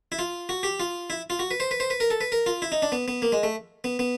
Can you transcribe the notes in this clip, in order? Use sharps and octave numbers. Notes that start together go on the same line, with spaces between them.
E4
F4
F#4
G4
F4
E4
F4
F#4
B4
C5
B4
C5
B4
A#4
A4
B4
A#4
F4
E4
D#4
D4
B3
B3
A#3
G#3
A3
B3
B3